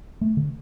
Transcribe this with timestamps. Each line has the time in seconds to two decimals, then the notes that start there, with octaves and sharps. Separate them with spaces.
0.21 A3
0.37 D3